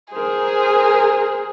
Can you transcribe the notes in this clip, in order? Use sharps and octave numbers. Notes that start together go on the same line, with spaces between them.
G#4 A#4 C5